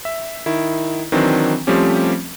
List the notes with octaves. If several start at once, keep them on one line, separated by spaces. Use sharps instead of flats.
E5
D#3 E4
D#3 E3 F#3 C4 D4
F3 G3 A3 C4 C#4 G4